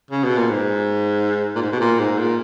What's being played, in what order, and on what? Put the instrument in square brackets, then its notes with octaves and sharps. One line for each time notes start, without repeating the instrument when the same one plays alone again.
[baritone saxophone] C#3
B2
A#2
G#2
A#2
G#2
B2
A#2
G#2
A#2